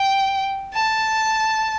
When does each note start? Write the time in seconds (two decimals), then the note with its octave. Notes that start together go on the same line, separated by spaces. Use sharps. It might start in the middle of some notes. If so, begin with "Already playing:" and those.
Already playing: G5
0.74 A5